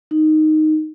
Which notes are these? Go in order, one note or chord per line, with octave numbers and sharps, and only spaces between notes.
D#4